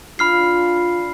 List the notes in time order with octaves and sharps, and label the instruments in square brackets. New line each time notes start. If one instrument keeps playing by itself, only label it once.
[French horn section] D4 F4 [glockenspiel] B5 F6 C7